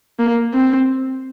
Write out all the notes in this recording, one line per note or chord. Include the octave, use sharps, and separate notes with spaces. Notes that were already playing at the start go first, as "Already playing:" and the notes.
A#3
C4